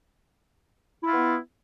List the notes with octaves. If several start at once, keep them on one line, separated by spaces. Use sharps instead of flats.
B3 E4 F4